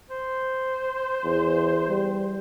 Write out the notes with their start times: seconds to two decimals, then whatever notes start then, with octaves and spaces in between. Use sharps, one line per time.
0.11 C5
1.24 E2
1.89 G3